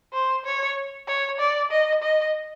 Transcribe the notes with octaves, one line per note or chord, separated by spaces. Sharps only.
C5
C#5
C#5
D5
D#5
D#5